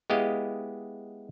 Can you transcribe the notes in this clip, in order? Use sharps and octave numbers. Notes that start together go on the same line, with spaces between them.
G#3 B3 E4 G4 D#5 F5